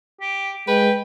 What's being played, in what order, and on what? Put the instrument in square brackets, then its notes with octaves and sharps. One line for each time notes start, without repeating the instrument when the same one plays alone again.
[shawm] G4
[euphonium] G#3 [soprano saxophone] B4 [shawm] G5